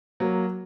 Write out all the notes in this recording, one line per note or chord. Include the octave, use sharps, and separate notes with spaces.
F#3 A#3